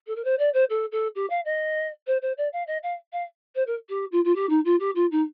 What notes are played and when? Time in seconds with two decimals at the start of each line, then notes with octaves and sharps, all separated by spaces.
0.07 A4
0.16 A#4
0.24 C5
0.39 D5
0.54 C5
0.70 A4
0.92 A4
1.15 G4
1.30 F5
1.45 D#5
2.07 C5
2.22 C5
2.37 D5
2.53 F5
2.67 D#5
2.83 F5
3.13 F5
3.55 C5
3.67 A#4
3.89 G4
4.12 F4
4.25 F4
4.35 G4
4.49 D#4
4.65 F4
4.80 G4
4.95 F4
5.11 D#4